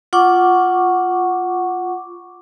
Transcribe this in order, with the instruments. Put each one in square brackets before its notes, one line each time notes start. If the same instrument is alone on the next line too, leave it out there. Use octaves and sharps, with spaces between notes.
[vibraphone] F4 F#5 C#6 D6